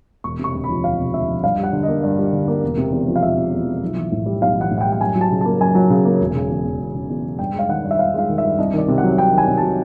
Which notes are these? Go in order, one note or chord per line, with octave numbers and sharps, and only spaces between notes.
E1 C#6
C3 C#6
D2
B5
F3
E1 F5
C3
D2 E5
F3
G2 F5
G3
F#5
D3
D#5
A#3
G2
G3
D3
A#3
E1
C3
E2
F3
F5
E1 E5
C3
E2
F3
B1
E3
A2
G3
B1 F5
E3 F#5
A2
F#5
G5
G3
G5
F#2 G#5
F#3
A5
C#3
A#3 A5
F#2 G#5
F#3
C#3
A#3
E1
C#3
E2
E1
E1
C#3
E2
E1
G2 G5
G#3 F5
D#3 F#5
G2
E5
G2 F5
G#3 F5
D#3
G2 E5
C2 D#5
D#3 D5
C3
F#5
F#3
C2 G5
D#3 G#5
C3
A5
F#3